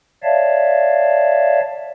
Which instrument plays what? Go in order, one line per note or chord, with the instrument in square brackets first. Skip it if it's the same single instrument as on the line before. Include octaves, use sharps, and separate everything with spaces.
[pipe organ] C#5 D5 E5 F5 A5